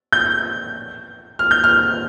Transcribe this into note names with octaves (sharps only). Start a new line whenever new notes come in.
G6
F6
G6
F6